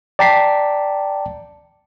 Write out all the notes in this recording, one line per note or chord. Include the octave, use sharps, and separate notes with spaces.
D5 G5 A5 A#5 B6 C7